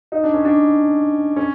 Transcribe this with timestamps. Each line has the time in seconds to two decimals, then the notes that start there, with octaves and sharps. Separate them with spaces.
0.12 D#4
0.23 D4
0.34 C#4
0.45 D4
1.36 C#4